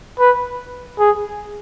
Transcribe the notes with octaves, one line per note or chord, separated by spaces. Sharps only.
B4
G#4